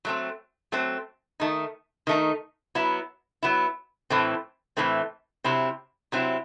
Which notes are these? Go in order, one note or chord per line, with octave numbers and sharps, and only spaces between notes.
F#3 A3 C4
F#3 A3 C4
D#3 A3 D#4
D#3 A3 D#4
F#3 B3 E4
F#3 B3 E4
A2 E3 A3 C4
A2 E3 A3 C4
C3 F#3 C4 E4
C3 F#3 C4 E4